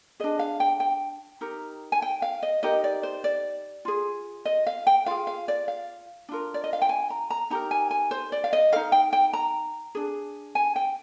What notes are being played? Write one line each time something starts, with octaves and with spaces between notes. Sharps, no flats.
D4 G#4 D#5
F5
G5
G5
D#4 G4 A#4
G#5
G5
F5
D#5
D#4 G4 A#4 D#5
D5
C5
D5
F4 G#4
D#5
F5
G5
F4 G#4 F5
F5
D5
F5
D4 F4 A#4
D5
D#5
F5
G5
G#5
A#5
A#5
D#4 G4 A#4 A#5
G#5
G#5
C5
D5
F5
D#5
D#4 A#4 F5
G5
G5
A#5
D4 G#4
G#5
G5